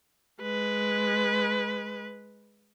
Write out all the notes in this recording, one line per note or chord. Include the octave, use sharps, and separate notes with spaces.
G#3 B4